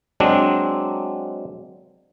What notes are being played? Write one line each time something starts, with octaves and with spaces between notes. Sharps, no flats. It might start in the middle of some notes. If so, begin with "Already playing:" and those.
F#3 G#3 C4 D4